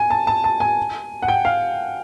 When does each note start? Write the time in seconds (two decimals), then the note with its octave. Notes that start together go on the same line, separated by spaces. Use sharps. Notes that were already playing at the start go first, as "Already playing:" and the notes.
Already playing: G#5
0.10 A5
0.27 A5
0.44 A5
0.60 G#5
1.22 F#5
1.28 G5
1.45 F5